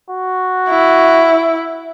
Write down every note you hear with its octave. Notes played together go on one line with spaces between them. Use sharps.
F#4
E4